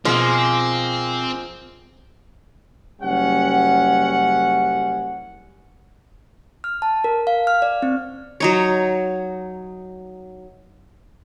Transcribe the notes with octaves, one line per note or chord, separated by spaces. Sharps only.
B2 F3 G#3 A#3 C4
F#1 G3 C#4 F#5
F6
A5
A#4
F5
F6
D5
C4
F#3 D#4 C#5